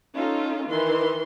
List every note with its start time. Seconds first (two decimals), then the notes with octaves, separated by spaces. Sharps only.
0.15 C#4 D#4 F4 A4
0.68 D#3 E3 C6